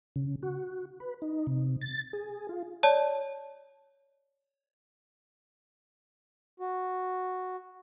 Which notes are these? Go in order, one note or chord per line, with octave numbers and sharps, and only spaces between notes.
C#3
F#4
B4
D#4
C3
A6
G#4
F4
C#5 D5 A5
F#4